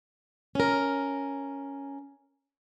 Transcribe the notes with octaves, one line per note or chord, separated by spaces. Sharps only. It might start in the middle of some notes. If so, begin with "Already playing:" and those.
C#4 A#4